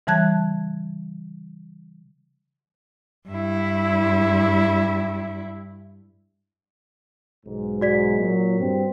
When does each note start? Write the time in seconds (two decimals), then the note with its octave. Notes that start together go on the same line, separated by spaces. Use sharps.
0.07 C#3 E3 G3 A5 F#6 G#6
3.29 G2 E4
7.46 B1 G#2
7.81 F#4 D5 B6
8.18 A#2 F#3
8.59 G2 C4